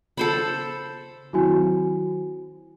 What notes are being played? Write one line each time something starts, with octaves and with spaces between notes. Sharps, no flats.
C#3 A4 C5 B5
D#3 F#3 C4 E4 F#4 G#5